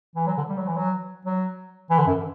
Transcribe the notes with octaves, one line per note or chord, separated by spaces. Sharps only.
E3
F#3
D3
G3
F#3
E3
F#3
F#3
E3
D3
F#2